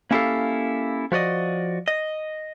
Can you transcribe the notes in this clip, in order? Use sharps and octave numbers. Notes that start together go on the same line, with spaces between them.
A#3 C#4 E4 G4 A4 F5
F3 F#4 D5 D#5
D#5